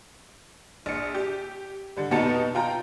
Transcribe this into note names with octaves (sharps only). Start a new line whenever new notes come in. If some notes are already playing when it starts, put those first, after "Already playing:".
A#1 C#7
G4
D3 G3
F1 B2 B3 D#4 A5 C#7
F4 G5 A#5